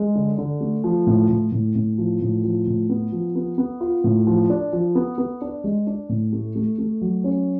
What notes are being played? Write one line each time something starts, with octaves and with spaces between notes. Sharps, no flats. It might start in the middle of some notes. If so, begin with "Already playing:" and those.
Already playing: G#3
D3
D3
A3
F3
A2
A2
A2
A2
F3
A2
F3
A2
B3
F3
B3
B3
F4
A2
F3
D4
F3
B3
B3
D4
G#3
D4
A2
A3
A3
A3
F#3
C#4